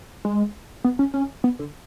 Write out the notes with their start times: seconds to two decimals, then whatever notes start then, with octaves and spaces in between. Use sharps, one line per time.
0.25 G#3
0.84 B3
0.99 C#4
1.14 C#4
1.44 B3
1.59 D3